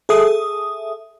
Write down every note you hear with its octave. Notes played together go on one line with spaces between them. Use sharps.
G#4 A4 E5 D#6